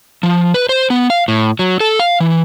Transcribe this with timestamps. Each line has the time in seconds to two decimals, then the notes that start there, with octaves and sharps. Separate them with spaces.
0.23 F3
0.54 B4
0.69 C5
0.90 B3
1.10 F5
1.28 A2
1.59 F#3
1.80 A4
2.00 F5
2.20 E3